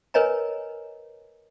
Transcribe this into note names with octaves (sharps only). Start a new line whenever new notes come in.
A#4 B4 C#5 D#5 G#5 A#5